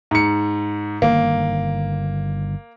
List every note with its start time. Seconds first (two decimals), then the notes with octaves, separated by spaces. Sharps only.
0.11 G#2 C#7
1.02 G1 D3 D#3 A#3